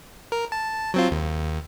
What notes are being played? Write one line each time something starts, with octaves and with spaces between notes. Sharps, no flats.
A#4
A5
F#3 C4 F4
D#2